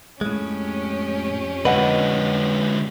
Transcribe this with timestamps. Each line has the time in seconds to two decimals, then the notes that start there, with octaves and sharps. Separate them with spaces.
0.21 F2 A2 G#3 C#4 G4
1.65 D3 G#3 B4 D#5 F#5